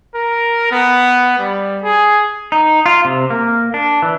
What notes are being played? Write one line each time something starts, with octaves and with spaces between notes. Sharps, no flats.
A#4
B3
G3
G#4
D#4
F4
C3
A#3
D4
E3